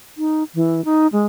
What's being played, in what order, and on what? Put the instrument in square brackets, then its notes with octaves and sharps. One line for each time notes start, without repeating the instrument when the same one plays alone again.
[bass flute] D#4
E3
D#4
G#3